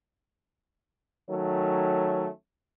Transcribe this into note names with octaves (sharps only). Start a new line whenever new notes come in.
D#3 F#3 A3 C#4